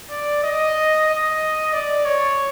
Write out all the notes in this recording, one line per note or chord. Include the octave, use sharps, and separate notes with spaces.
D5
D#5
D#5
D5
C#5